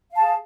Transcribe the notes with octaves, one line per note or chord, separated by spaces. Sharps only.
G#4 F5 A5